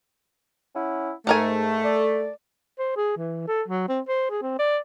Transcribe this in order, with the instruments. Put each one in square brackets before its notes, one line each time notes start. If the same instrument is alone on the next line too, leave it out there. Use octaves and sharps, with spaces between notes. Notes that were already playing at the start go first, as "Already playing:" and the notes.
[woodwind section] C#4 E4 F#5
[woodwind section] G#2 [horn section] A3 [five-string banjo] A4 A#4 G#5
[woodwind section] D5
[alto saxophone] C5
G#4
E3
A4
F#3
C4
C5
G#4
C4
D5